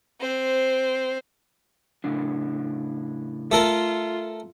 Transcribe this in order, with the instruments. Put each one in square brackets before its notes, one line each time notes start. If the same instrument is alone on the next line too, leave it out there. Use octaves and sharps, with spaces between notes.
[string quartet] C4 C5
[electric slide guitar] A2 C#3 D4
[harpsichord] A3 A4 A#4 [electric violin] F4